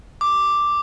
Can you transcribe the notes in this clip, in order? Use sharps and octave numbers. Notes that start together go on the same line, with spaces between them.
D6